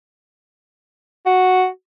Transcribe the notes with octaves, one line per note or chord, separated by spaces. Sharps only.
F#4